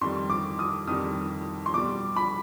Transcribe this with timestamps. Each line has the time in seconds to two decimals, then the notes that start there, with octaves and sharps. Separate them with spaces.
0.01 F2 D#3 G3 C6
0.30 D6
0.59 D#6
0.87 F2 D#3 G3 D#6
1.66 C6
1.74 B2 G3 D6
2.16 B5